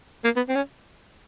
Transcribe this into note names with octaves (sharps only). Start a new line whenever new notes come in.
A#3
B3
C4
C#4